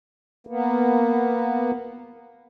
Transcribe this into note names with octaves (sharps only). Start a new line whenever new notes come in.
A#3 B3